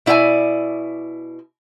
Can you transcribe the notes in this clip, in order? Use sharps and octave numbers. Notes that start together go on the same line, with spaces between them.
B2 E4 D5 E5 G#5